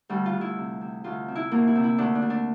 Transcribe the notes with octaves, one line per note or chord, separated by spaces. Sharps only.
D2 G3
F4
D2
E4
C3
C3
D2 F4
C3
E4
D2 A#3
E4
C3
E4
D2 D4
D4
D2
D4